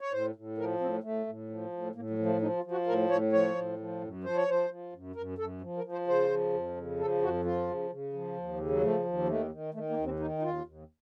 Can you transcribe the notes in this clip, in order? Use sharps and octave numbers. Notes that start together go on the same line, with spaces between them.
C#5
A2 C5
A2
F3 A#4
A2 C4
A2 A3
A2
F3
A2
A2 A#3
F#3
F3
A3
F3 D#4
F4
F3
F#4
A2 A#4
A2 C#5
F3 C#5
A2
F3
F#2
F3 C5
C#5
F3 C5
F3
F#2
F#2 A#4
F#2 A4
F3
A#4
F3
C5
C#3 C5
F3
F2
C#3
F3 A4
F2 F#4
F3 F4
C#3
C#3
F3
D#2
C#3
F#3
F3 A3
D#2
D#3 A3
D#3
D#3 A3
A#3
D#2
C4
D#3 D#4
D#4
D#2 F4
D#2